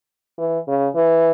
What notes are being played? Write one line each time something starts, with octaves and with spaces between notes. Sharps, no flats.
E3
C#3
E3